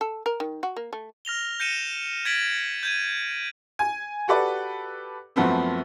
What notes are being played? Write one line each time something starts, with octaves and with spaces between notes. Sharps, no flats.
A4
A#4
D#3
F#4
A#3
A3
F6 A#6 F7 G7
G6 A#6 C#7 D#7 E7
G#6 A6 B6 D7 F#7
G6 G#6 D#7
G#5
F#4 G4 A4 B4 D5
F#2 F3 A3 B3 C4